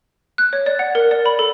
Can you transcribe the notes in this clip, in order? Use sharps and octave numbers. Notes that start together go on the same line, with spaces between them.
F#6
C#5
D5
F#5
A#4
D5
B5
A4